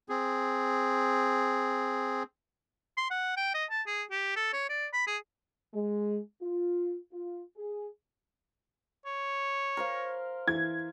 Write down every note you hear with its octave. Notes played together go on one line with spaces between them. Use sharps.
C4 G#4
C6
F#5
G5
D#5
A5
G#4
G4
A4
C#5
D5
B5
G#4
G#3
F4
F4
G#4
C#5
A#4 C5 F5
E3 G#6